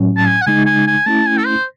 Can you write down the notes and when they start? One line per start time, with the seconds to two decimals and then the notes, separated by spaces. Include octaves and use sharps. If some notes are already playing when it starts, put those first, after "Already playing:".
Already playing: A2 F#3 C#4
0.17 A5
0.27 G#5
0.42 F#5
0.46 C#3 G#3 D#4 G#5
0.66 G#5
0.87 G#5
1.06 A3 C#4 E4 A5
1.27 G#5
1.38 A4
1.46 C5